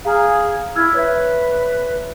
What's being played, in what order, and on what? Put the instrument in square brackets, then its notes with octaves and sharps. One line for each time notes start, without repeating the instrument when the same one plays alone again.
[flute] G#4 [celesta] F5 A#5 F6
[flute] E4 [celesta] E6 F6 G#6
[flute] B4 [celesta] C#5 E5